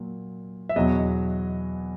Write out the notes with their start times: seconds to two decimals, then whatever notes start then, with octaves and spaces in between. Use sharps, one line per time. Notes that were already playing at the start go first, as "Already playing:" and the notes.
Already playing: A#2 F#3
0.69 E5
0.76 E2 B2 F#3 D#5